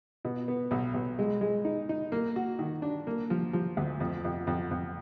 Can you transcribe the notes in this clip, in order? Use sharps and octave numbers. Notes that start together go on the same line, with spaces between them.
B2
B3
B1
B1
G#3
G#3
D#4
D#4
A#3
F#4
D#3
D4
A#3
F3
F3
D2
F2
F2
F2
F2